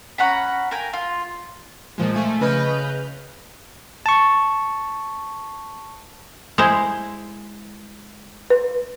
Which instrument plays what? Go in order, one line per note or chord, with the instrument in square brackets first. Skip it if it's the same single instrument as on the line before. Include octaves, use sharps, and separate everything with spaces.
[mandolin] C#4 F#5 A#5 B5
A#4 F5 G5 G#5
F4
[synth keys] A#2 F3 G#3
F3 A3 G#5
C#3 B4 D#5 F6 G6
[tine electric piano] A5 C#6
[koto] G#3 E4 C5
[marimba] B4